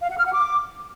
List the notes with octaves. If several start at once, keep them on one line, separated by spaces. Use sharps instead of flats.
F5
F#5
F6
F#5
D6